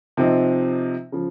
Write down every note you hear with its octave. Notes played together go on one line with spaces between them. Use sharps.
C3 F3 C4 D#4
C#3 F3